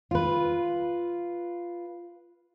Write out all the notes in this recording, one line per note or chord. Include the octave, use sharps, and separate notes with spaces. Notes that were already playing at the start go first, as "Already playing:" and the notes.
F4 B4